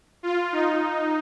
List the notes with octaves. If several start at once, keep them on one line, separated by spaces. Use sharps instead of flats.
F4
D#4